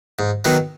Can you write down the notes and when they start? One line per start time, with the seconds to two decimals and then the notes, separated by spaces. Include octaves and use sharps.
0.19 G#2
0.45 D#3 F#3 B3 D#4